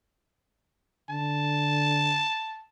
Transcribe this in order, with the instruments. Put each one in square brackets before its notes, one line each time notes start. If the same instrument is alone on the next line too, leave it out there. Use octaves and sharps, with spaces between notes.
[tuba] D3 [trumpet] A5